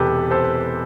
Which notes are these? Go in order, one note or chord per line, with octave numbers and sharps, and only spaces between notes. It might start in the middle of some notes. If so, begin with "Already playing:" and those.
Already playing: E1 E2 C3 E3 G4 A4 B4
A4 C5